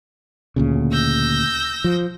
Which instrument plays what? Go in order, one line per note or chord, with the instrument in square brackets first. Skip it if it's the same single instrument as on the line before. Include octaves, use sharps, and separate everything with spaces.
[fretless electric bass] D2 A#2 C#3
[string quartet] E6 G6 A#6
[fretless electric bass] F3